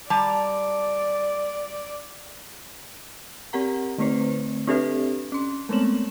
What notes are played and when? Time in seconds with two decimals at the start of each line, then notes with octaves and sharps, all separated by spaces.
0.10 G3 D5 A5 A#5
3.53 C4 G4 A#4 F#5 A#5
3.98 D3 A3 C4 B4 C5
4.67 C4 D4 G4 A4 B4 E5
5.32 C#4 C6
5.69 G#3 A3 B3 C4 E7 F#7